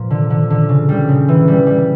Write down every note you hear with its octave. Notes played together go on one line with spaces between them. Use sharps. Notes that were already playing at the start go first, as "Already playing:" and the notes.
Already playing: A#2 F3 A#3
D3
D3
D3
C#3
G3
C#3
E3
G3
G3